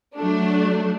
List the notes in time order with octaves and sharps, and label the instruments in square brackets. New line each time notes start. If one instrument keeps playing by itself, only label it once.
[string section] F#3 A3 D4